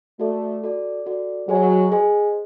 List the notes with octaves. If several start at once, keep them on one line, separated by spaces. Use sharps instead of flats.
A3 F#4 A4 D5
F#4 A4 D5
F#4 A4 D5
F#3 G#4 C5 D#5 G#5
G#4 C5 D#5 G#5